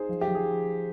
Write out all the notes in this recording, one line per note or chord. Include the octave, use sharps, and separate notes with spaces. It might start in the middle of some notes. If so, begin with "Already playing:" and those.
Already playing: D#4 G#4 C5
F3
G4
F3
G#4